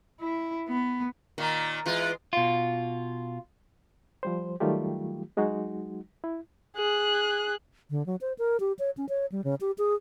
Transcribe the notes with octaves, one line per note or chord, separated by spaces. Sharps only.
E4
B3
A#2 D#3 A#3
E3 G#3 F4
B2 F4
F3 G3 C5
D#3 F#3 G3 A3 F4 G4
F#3 G#3 D#4 F#4
E4
G#4 F#6
D3
F#3
C5
A#4
G4
C#5
C#4
C#5
G3
C#3
G4
G#4